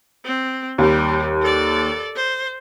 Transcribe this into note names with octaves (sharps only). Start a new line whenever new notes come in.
C4
D#2 G3 G4
A4 D5
C5